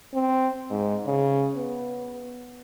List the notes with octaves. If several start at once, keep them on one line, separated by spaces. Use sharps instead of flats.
C4
G#2
C#3
B3